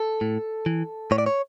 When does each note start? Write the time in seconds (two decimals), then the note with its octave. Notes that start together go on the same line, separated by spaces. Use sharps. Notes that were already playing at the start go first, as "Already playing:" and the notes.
Already playing: A4
0.21 A2
0.66 E3
1.11 A2 C#5
1.18 D5
1.26 C#5